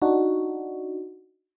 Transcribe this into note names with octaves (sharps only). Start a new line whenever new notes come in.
D4 D#4 F#4